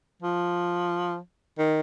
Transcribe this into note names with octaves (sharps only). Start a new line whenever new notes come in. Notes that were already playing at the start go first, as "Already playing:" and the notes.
F3
D#3